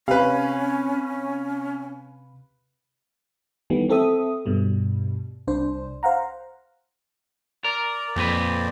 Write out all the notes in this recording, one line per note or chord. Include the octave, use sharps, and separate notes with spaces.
C3 C#4 B4 F5
D#3 E3 G3 A3 B3
C4 A4 E5 D#6
G2 B2 G3
C2 D4 C5
C5 F5 F#5 A#5
A#4 D5
F2 A#2 C4 B4